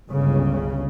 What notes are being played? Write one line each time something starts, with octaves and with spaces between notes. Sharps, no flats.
G1 C#2 C#3